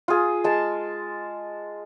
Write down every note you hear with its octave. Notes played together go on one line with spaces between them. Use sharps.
F4 G#4
G#3 A5